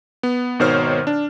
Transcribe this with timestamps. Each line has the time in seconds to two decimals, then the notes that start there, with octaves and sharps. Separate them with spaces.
0.23 B3
0.59 G#1 B2 D#3 C5 C#5 F6
1.07 D4